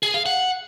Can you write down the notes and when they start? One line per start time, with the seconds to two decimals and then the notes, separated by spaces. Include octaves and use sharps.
0.03 G#4
0.14 F5
0.26 F#5